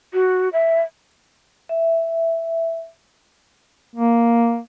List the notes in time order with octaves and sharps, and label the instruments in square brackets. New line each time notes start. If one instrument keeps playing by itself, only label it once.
[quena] F#4
E5
[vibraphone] E5
[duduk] A#3